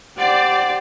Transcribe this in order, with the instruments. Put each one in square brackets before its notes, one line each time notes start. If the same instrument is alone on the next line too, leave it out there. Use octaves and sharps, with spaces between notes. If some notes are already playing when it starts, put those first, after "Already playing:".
[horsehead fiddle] G4 C5 [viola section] D5 [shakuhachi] F#5